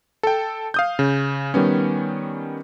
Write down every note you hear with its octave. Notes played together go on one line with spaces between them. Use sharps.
A4 G5
F5 D#6 G6
C#3
D#3 G3 B3 C#4